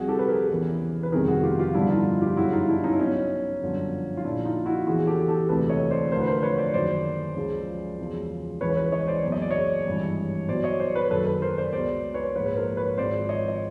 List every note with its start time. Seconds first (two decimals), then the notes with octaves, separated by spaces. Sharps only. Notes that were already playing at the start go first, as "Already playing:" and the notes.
Already playing: C2 C3 F3 F#4 G#4
0.08 G4 A4
0.19 B4
0.29 G#4 A#4
0.50 E2 C#3 E3
1.03 B4
1.12 G1 F2 C3 D#3 G#4 A#4
1.28 F#4 G#4
1.43 F4 G4
1.59 F4 G4
1.74 G1 G2 D3 F3 D4 E4
1.90 D#4 F4
2.22 F4 G4
2.37 G1 F#2 C#3 E4 F#4
2.52 D#4 F4
2.68 D4 E4
2.84 C#4 D#4
2.92 E4
2.99 B1 B2 C#4 D#4
3.62 G1 F#2 D3 F3
4.17 F4
4.24 A#1 A#2 F3 D4 E4
4.45 D#4 F4
4.66 E4 F#4
4.87 E2 C#3 E3 F#4 G#4
5.07 G4 A4
5.28 G4 A4
5.49 E1 D2 C3 E3 A4 B4
5.69 C#5 D#5
5.91 C5 D5
6.11 D2 D3 F3 A#4 C5
6.21 B4
6.27 A#4 C5
6.43 B4 C#5
6.58 C5 D5
6.74 F#1 F#2 D#3 C5 D5
7.36 C#2 C#3 F3
7.99 E1 E2 C#3 F3
8.61 C#2 C#3 E3 B4 C#5
8.76 B4 C#5
8.92 C#5 D#5
9.08 C5 D5
9.23 F#1 E2 B2
9.32 D#5
9.42 D5
9.51 C#5 D#5
9.86 G#1 G2 E3
10.48 B1 B2 C5 D5
10.64 C#5 D#5
10.79 C5 D5
10.95 B4 C#5
11.10 F#1 F#2 D#3 A4 B4
11.26 A4 B4
11.42 A#4 C5
11.58 C5 D5
11.72 C#2 B2 C5 D5
12.14 B4 C#5
12.35 A#1 G#2 F3 B4 C#5
12.46 B4
12.57 A#4 C5
12.77 B4 C#5
12.98 G#1 G#2 F3 C5 D5
13.29 C#5 D#5
13.48 D#5